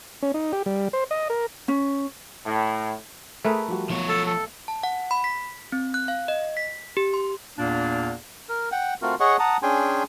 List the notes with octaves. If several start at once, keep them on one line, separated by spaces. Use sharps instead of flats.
C#4
D#4
G4
G3
C5
D#5
A#4
C#4
A2
A3 G#4 A#4 B4 G#5
F3 G3 F#4
B1 F3 C#5
A4 A5
A4
A5
F#5
B5
B6
C4
F#6
F5
D#5
B6
G4
C6
E2 A#2 A#3 D4
A#4
F#5 G5
A3 C4 F4 F#4 A#4
G#4 C#5 D#5 F#5 C#6
F#5 A5 A#5 D#6
C#4 D4 G#4 G5 G#5 C6